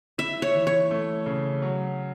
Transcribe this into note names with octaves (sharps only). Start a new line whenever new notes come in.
E4 E5
C#5
E3
C#5
A3
C#3
F#3